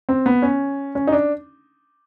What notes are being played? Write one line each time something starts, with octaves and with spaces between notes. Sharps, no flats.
C4
B3
C#4
C#4
D#4
D4